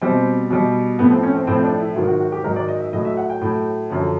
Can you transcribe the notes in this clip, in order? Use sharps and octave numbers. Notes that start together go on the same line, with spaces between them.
B2 G3 C4
B2 G3
A2 F3 B3
C4
C#4
C4
A2 F3 C4
D4
E4
G#2 D#3 F#3 F4
F#4
F#4
G4
G#2 D#3 F#3 A#4
D5
D#5
E5
A2 F#3 D#5
E5
F#5
G5
A2 F#3
F#2 D3 F3